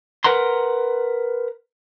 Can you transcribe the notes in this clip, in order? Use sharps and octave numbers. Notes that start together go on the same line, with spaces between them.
A#4 B4 F#5 A#5 C6